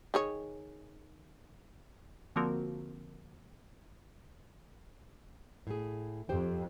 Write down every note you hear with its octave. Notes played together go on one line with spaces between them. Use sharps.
D#3 G#4 C#5
D3 F3 A#3 C4 F#4 A#4
A2 G#4
F2 G4 C5 G5